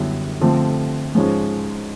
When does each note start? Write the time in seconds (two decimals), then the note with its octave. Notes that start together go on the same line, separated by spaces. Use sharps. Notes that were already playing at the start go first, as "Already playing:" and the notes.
Already playing: F#2 D3 G3 B3 E4
0.41 D3 F3 A3 C4
1.15 G#2 F3 G#3 C#4